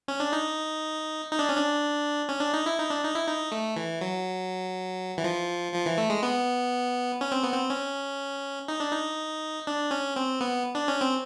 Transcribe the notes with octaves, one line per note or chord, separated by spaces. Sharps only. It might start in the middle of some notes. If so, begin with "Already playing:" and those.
C#4
D4
D#4
D#4
D4
C#4
D4
C#4
D4
D#4
E4
D#4
D4
D#4
E4
D#4
A3
E3
F#3
E3
F3
F3
E3
A3
G#3
B3
C#4
C4
B3
C4
C#4
D#4
D4
D#4
D4
C#4
C4
B3
D4
C#4
C4